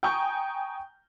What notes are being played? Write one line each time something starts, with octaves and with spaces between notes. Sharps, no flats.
G5 G#5 A#5 C#6 D#6 G6